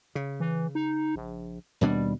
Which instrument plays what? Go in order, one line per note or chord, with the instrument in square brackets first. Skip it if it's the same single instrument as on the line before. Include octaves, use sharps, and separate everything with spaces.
[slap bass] C#3
[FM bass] E3
D#4
A#1
[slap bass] D#2 B2 D4 [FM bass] G3